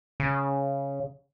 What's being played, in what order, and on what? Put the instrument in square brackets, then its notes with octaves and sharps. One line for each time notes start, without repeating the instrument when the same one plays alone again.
[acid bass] C#3